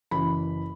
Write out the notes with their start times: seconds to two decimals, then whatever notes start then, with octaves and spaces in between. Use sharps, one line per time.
0.11 F#1 F#2 E3 B5